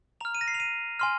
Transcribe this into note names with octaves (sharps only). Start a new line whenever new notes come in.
A#5 F6 F7
D#7
A#6
C7
F7
D#7
G#5 C6 F6